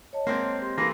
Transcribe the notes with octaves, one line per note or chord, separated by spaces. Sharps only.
C#5 D#5 A5
G#3 A#3 C4 C5
G4 C6
E3 A3 A#3 B4